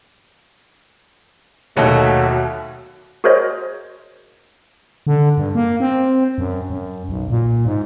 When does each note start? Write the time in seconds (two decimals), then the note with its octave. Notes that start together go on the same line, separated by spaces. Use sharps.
1.77 D#2 B2 F#3 A3 E5
3.24 F#4 G#4 A#4 C5 C#5 D#5
5.07 D3
5.38 G2
5.55 A#3
5.80 C4
6.38 F#2
6.70 F#2
7.09 B1
7.30 A#2
7.65 G#2